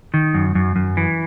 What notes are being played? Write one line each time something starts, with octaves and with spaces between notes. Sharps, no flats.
D#3
F#2
F#2
F#2
E3